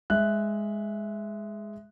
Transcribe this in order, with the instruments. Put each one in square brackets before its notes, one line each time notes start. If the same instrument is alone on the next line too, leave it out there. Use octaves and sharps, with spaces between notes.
[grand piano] G#3 E5 F#6